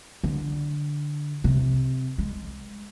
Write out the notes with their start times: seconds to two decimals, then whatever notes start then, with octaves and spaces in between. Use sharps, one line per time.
0.24 D3
1.44 C3
2.18 G#3